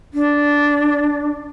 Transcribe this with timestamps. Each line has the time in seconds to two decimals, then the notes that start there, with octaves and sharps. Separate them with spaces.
0.14 D4